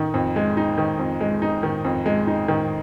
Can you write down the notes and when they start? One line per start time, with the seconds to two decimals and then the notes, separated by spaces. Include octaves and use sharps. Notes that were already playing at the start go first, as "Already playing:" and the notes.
Already playing: D#3 D#4
0.14 F2
0.36 G#3
0.57 D#4
0.78 D#3
0.99 F2
1.21 G#3
1.42 D#4
1.63 D#3
1.85 F2
2.06 G#3
2.27 D#4
2.48 D#3